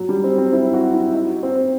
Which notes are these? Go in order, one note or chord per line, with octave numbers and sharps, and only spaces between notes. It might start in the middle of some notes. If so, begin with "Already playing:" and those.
Already playing: F#3
G3
C4
C4
E4
F#4
E4
D#4
C4